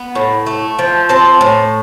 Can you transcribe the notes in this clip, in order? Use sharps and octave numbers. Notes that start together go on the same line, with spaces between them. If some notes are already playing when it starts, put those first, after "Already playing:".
Already playing: B3
A2
A3
F3
C4 A5
A2